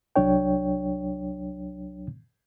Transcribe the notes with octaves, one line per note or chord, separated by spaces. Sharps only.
C2 F#3 D4 C#5 G5